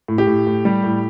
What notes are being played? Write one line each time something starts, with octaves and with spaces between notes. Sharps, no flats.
A2
G4
A2
A2
G3
A2